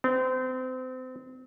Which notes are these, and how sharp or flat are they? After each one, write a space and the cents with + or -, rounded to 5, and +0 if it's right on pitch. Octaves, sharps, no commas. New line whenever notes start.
C4 -30